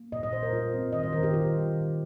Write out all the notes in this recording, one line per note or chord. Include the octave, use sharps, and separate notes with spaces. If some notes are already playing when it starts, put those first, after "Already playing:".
Already playing: A#3
A#2 D#5
D#5
A#2 C5
A#4
G3 F4
C4
D#3 D#5
C5
D#3 A#4
G4
D#3 F4
G3
D#3